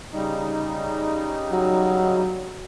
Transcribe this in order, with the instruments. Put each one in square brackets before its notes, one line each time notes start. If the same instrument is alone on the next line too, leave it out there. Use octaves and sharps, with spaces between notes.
[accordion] C#3 G3 D#4
[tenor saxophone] F#3